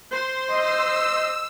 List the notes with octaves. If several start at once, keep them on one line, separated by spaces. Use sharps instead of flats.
C5 C6
D#5 E6